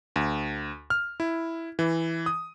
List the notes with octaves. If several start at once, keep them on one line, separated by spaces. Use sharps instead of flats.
D2
F6
E4
E3
D#6